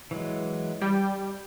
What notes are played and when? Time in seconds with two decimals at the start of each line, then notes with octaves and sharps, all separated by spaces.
0.11 E3 F#3 G#3
0.82 G3 G5